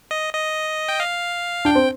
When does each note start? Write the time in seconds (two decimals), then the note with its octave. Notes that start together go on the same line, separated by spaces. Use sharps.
0.11 D#5
0.34 D#5
0.89 G5
1.00 F5
1.65 D4 G5
1.75 C4